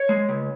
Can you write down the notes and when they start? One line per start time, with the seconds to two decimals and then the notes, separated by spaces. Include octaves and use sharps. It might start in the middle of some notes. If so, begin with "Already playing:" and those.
Already playing: C#5
0.09 G#3
0.29 C#2